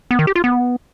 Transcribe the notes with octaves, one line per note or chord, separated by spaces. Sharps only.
B3
D#3
G4
F4
B3